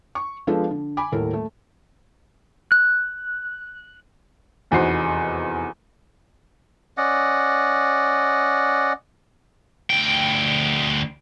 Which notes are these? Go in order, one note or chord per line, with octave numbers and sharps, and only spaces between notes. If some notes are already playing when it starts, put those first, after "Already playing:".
C#6
F3 G#3 B3 D4 F4 A4
D3
G#5 B5 D6
D#1 A2 A4 A#4
A3
F#6
F1 E2 D#4 F#4 C5 C7
C#4 D5 D#5 F#5
D2 G5